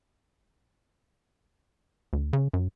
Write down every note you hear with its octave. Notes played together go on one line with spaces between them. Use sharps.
D2
C#3
F#2